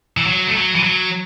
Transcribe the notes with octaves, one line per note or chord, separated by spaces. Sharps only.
E3
F#3
A3
F#3
E3
F#3